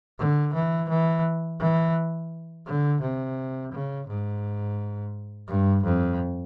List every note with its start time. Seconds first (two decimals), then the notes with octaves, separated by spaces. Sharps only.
0.19 D3
0.54 E3
0.89 E3
1.60 E3
2.66 D3
3.01 C3
3.72 C#3
4.07 G#2
5.48 G2
5.84 F2